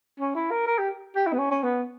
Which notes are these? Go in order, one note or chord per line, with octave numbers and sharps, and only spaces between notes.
C#4
E4
A#4
A#4
G4
G4
E4
B3
C#4
C#4
B3